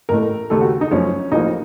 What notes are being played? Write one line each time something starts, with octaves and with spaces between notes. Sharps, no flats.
A1 A2 A3 A#4
D#2 C#3 A3 A4
F#4
D#4
F#2 F3 A3 C#4
A1 A2 F3 A#3 D#4